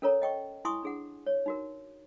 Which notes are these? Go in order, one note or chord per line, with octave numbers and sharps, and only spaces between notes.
C#4 A4 A#4 C#5 A#5
D#5 G5 C#6
E4 G#5 C6 C#6 D#6
D4 G#4 F#5
C#5
D#4 F#4 A#4